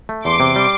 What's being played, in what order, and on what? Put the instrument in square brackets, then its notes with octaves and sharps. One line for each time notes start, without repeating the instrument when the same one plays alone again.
[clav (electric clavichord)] A3
[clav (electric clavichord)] E2 [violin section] C6 D6
[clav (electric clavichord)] C3
G3